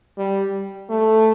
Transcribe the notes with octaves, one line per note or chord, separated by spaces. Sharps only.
G3
A3